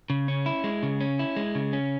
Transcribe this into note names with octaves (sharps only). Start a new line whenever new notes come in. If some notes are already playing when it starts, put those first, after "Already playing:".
C#3
C#4
E4
G#3
C#3
C#4
E4
G#3
C#3
C#4